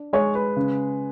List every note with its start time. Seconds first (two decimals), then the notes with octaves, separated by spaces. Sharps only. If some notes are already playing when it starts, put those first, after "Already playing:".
Already playing: D4
0.13 G#3 C#5
0.35 B4
0.57 C#3